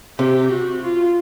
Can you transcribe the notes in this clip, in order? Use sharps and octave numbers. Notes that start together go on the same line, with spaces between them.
C3 G4
F#4
F4